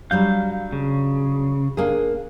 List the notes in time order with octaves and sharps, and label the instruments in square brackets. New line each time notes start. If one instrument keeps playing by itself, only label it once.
[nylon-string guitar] F#3 G3 D4 [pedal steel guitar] F5 G6
[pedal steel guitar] C#3
[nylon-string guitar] A#3 D4 G#4